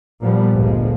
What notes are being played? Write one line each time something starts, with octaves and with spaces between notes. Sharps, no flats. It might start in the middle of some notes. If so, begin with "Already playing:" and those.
A#2 F3 G3 B3
G1 D2 A#2 F3 G#3